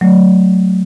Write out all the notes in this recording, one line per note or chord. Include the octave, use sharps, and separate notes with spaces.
F#3 A3